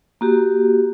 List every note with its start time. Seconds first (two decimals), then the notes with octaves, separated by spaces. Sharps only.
0.21 A#3 F#4 G4